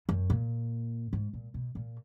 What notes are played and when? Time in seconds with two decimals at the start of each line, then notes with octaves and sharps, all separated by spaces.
0.09 F#2
0.30 A#2
1.13 G#2
1.33 A#2
1.54 B2
1.75 A#2